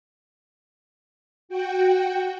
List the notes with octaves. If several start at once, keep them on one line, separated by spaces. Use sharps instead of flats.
F#4 G5